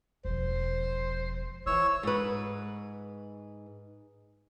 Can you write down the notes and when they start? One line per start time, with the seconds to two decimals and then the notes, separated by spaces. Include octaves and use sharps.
0.25 E1 F3 C5
1.67 E3 F4 C#5 E6
2.03 G#2 B4